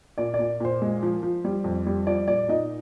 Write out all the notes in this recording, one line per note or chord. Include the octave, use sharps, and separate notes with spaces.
A#2 D5
D5
A#2
A#2 C5
G#3
F3
F3
G3
F2
G3
F3 D5
A#2 D5
A#2 D#4 D#5